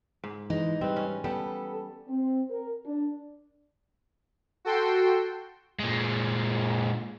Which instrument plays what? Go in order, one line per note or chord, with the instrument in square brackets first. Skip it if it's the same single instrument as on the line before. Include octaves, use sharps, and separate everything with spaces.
[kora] G#2
[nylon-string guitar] E3 G#3 [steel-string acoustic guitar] D#4
[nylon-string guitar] G3 B4 [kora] C4
[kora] C#4
[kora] G3 [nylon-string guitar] B3 [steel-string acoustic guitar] A4
[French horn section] C4
A#4
D4
[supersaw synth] F#4 A4 G5 C6
[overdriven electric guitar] A#2 G#3